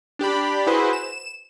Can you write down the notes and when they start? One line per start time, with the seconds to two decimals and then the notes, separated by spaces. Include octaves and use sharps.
0.19 D4 G4 D5 B5
0.67 E4 F#4 G#4 B4 C5
0.93 E7